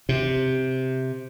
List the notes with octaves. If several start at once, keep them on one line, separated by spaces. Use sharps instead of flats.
C3